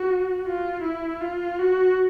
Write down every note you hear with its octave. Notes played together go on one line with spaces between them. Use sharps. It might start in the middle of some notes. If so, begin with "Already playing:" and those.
Already playing: F#4
F4
E4
F4
F#4